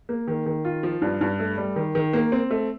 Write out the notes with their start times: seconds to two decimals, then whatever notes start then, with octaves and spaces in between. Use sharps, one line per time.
0.09 A#3
0.27 D#3
0.46 D#3
0.65 F4
0.83 F3
1.02 G2
1.21 G2
1.39 A3
1.58 G3
1.76 D#3
1.95 D#3
2.13 A#3
2.32 C4
2.51 A3